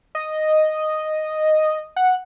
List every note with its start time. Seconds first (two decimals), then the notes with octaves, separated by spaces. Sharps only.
0.15 D#5
1.96 F#5